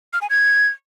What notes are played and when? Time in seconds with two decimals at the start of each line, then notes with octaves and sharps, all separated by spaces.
0.13 F6
0.22 G#5
0.30 G#6